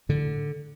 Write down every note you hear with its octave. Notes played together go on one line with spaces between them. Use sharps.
A2 D3